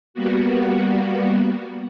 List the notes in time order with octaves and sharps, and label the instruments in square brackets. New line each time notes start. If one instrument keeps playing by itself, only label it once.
[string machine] G3 A#3 B3 F#4